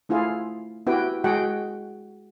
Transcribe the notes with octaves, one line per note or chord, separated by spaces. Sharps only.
A3 E4 F4 G#4 F5
B3 E4 F#4 G4 B4 G5
G#3 F#4 G#4 F#5 G5